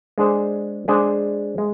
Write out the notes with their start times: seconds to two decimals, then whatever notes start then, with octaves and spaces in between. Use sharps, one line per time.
0.18 G#3 D4 G#4 C5
0.88 G#3 D4 G#4 C5
1.58 G#3